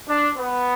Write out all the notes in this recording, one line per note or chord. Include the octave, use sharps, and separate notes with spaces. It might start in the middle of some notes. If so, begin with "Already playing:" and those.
D4
B3